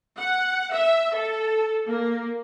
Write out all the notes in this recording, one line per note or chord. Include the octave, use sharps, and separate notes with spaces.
F#5
E5
A4
A#3